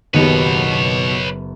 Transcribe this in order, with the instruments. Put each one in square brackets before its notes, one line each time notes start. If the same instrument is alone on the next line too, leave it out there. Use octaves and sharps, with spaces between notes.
[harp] F#1 B3 [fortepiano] D#2 D#3 G4 [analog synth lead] B2 [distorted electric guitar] B4 C#5